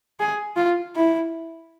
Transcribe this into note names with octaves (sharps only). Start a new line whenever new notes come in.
G#4
F4
E4